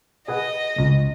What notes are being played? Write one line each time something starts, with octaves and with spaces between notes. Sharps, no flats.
G#4 B4 D#5 F#5
C#2